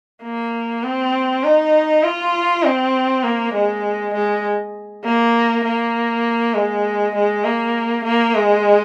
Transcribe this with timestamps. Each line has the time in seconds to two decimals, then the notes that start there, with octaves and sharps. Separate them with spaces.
0.23 A#3
0.83 C4
1.44 D#4
2.04 F4
2.64 C4
3.24 A#3
3.54 G#3
4.14 G#3
5.04 A#3
5.64 A#3
6.54 G#3
7.15 G#3
7.44 A#3
8.04 A#3
8.35 G#3